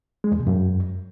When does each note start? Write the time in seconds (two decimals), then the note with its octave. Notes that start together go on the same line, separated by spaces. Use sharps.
0.24 G#3
0.32 E2
0.39 B2
0.47 F#2